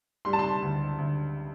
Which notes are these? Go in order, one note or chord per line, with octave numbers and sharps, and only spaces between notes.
G3 C6
A5
C6
D2
D2